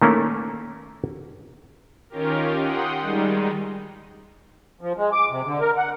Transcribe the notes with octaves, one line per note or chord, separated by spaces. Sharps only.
D#3 A3 A#3 C#4 E4
D#3 C#4 F4 G4 A#4
F#5 G5 C6 D#6
D#3 G3 G#3 D#4
F3
G#3
D6
C3
D3
A#4
F#5